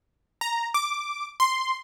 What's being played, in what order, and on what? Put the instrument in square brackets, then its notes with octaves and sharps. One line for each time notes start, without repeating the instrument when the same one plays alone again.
[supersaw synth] A#5
D6
C6